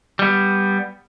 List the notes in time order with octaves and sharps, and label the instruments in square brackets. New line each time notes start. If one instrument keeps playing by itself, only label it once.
[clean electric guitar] G3 B3